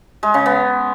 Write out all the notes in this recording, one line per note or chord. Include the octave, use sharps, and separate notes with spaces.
G#3
C#3
B3